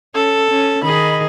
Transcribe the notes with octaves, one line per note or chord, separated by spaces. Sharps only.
C#4 A4
C#4
D#3 G#4 D#5 B5